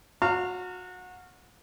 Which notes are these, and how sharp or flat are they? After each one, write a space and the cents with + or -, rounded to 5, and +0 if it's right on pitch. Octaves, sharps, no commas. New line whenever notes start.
F#4 -25 F5 +0 A#5 -35